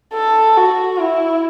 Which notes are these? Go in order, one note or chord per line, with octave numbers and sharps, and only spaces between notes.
A4
F#4
E4